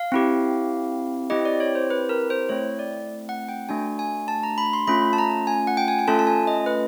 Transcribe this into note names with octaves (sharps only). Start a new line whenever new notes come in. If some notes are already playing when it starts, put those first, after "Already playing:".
Already playing: F5
C4 E4 G4
C4 E4 G4 D#5
D5
C#5
C5
B4
A#4
C5
A3 C4 E4 C#5
D5
F#5
G5
A3 D4 F#4 G#5
G#5
A5
A#5
B5
C6
A3 C#4 F4 B5
A5
A#5
G#5
F#5
G5
G#5
G#5
A3 C#4 F4 A4 A5
A5
G#5
D#5
B4